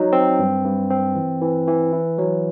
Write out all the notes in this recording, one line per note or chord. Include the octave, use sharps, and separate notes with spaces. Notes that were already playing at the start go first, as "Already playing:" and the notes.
Already playing: F#3 D#4
C4
G2
G2
C4
E3
E3
E3
E4
F#3